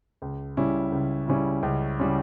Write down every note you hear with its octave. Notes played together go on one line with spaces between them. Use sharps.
C#2
C#3 G3 C#4 E4
C#2
C#3 G3 C#4 E4
C#2
C#3 G3 C#4 E4